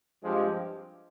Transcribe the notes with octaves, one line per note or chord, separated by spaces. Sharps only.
G2 F3 G#3 C4 G4